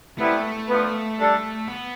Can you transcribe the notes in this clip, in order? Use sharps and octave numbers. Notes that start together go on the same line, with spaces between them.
C3 G3 A3 B3 E4
D3 F3 B3
G3 D4 A4
B3